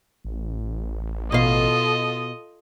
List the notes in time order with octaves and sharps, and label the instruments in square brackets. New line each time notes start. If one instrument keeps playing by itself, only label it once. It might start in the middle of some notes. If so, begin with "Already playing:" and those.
[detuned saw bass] A1
[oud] B2 F5 [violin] F4 A4 [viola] D#5